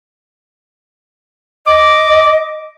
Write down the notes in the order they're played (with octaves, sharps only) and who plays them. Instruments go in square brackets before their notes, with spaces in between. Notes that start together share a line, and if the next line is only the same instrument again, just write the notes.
[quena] D#5 [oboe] D6